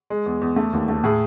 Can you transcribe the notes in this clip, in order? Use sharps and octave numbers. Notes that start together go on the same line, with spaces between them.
G#3
E2
E2
A3
D#2
A3
A2 G#4